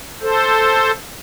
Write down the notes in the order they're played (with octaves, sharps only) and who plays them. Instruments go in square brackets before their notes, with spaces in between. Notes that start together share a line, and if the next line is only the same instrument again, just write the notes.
[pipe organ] A4 C5